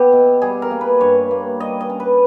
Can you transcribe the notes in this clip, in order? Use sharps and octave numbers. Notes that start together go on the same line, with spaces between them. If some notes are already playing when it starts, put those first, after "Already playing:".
Already playing: B3 E4 G4
B2
G3 G#4
A#4
A#3
B4
G2 C#5
A#3
G3 D#5
D#5
C#4
B4